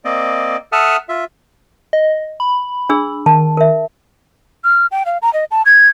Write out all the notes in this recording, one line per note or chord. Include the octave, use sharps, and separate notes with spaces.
A#3 C4 D5 D#5
A4 E5 F#5 A5 D#6 F6
F4 E5
D#5
B5
D4 G#4 E6
D#3 A5
A#4 E5
F6
G5
F5
A#5
D#5
A5
G#6